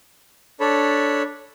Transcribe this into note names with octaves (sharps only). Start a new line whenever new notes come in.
D4 A4 C#5 B5